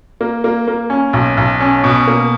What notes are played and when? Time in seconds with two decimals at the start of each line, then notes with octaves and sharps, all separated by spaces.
0.21 A#3
0.44 A#3
0.68 A#3
0.90 C#4
1.13 B1
1.37 B1
1.60 C#4
1.84 B2
2.07 A#3